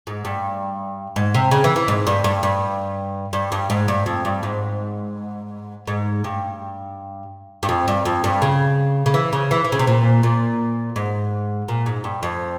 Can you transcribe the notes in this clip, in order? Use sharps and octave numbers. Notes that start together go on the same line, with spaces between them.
G#2
G2
G#2
C3
C#3
E3
E3
G#2
G2
G2
G2
G2
G2
G#2
G2
F2
G2
G#2
G#2
G2
G2
F2
G2
F2
G2
C#3
C#3
E3
C#3
E3
E3
C#3
C3
A#2
A#2
G#2
A#2
G#2
G2
F2